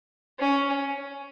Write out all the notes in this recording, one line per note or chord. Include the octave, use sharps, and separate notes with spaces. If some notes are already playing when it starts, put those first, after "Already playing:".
C#4